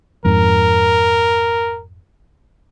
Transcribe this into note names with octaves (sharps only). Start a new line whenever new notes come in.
F2 G#2 A#4